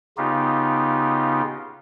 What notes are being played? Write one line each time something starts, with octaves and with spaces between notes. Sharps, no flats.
C#3 B3 D#4 F4 G4